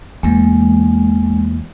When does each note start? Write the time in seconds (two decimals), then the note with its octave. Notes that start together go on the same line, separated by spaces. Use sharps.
0.23 E2 E3 G#3 A#3